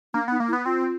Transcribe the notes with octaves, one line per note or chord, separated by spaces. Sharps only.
A#3 D4
B3 D#4
A#3
E4
B3
C4 F4